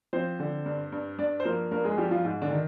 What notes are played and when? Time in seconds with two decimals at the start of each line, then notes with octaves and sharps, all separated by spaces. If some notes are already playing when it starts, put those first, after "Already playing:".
0.13 F3 C4 C5
0.39 D3
0.66 G2
0.92 G2
1.18 G2 D4 D5
1.40 C5
1.45 F3 A#3 A#4
1.71 G2 A#3 A#4
1.84 G#3 G#4
1.98 F3 G3 G4
2.11 F3 F4
2.25 G#2
2.42 D3 D4
2.51 D#3